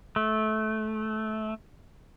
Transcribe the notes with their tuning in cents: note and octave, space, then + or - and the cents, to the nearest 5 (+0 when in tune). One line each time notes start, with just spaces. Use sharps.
A3 -20